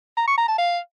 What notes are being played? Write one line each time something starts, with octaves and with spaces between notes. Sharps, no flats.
A#5
C#6
A#5
A5
F5